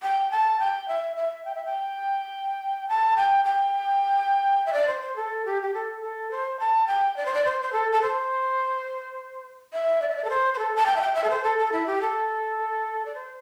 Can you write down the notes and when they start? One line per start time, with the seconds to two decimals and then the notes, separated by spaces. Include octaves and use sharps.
0.02 G5
0.31 A5
0.59 G5
0.88 E5
1.16 E5
1.45 G5
1.54 E5
1.65 G5
2.88 A5
3.16 G5
3.44 G5
4.66 E5
4.73 D5
4.87 C5
5.01 C5
5.16 A4
5.45 G4
5.62 G4
5.74 A4
6.01 A4
6.31 C5
6.59 A5
6.87 G5
7.16 D5
7.25 C5
7.34 D5
7.44 C5
7.62 C5
7.72 A4
7.92 A4
8.02 C5
9.73 E5
10.01 D5
10.09 E5
10.16 D5
10.24 A4
10.29 C5
10.54 C5
10.58 A4
10.75 A5
10.86 G5
10.96 E5
11.01 G5
11.14 E5
11.23 A4
11.30 C5
11.43 A4
11.58 A4
11.72 E4
11.86 G4
12.01 A4
13.05 D5
13.14 C5